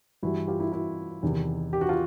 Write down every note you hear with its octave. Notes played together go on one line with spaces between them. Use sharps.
G2 E3 G3 E4 F#4
F4 G4
E4 F#4
E4 F#4
E2 C3 D#3
G4
F#4
F4 G4